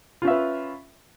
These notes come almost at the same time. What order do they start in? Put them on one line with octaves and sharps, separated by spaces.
F4 C#4 E5 B4